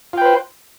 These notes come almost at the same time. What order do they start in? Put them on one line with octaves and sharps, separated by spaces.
F4 G5 B4 C5